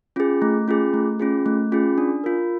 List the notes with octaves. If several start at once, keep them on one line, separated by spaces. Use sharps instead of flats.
C#4 F4 G#4
A3
C#4 F4 G#4
A3
C#4 F4 G#4
A3
C#4 F4 G#4
D4
F4 A#4